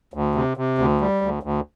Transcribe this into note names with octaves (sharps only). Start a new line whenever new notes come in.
D2
C3
C3
D2
G3
D2
D2